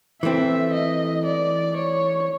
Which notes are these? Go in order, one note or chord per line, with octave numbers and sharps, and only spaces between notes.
E3 A3 C4 E5
D#5
D5
C#5